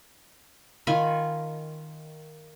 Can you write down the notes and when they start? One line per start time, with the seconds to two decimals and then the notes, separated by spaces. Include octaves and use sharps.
0.87 D#3 F4 G#5 B5